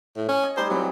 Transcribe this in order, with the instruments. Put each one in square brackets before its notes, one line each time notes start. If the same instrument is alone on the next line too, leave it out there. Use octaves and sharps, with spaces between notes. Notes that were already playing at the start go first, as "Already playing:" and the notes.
[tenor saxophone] A2
C#4
[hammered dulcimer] D#5 G#5
[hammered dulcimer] G3 A3 D#4 [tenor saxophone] C5
[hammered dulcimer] E3 C4 E4 [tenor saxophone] F#3